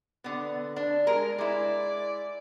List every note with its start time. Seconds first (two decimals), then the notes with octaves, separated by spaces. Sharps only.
0.24 D3 B3
0.76 D4
1.07 G#3 A#4
1.38 G#3 E4 D5